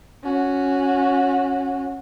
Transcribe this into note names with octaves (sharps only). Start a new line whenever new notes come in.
C#4 F#4